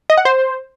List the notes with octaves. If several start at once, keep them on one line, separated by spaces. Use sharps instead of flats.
D#5
F#5
C5